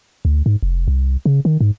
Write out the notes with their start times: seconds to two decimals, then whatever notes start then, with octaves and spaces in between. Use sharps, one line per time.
0.25 D2
0.46 G#2
0.63 F1
0.88 C2
1.26 C#3
1.45 D#3
1.61 G#2